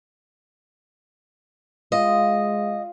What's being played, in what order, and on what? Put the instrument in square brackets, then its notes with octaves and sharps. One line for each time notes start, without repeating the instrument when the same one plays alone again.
[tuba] G#3 [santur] F4 [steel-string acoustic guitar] D#5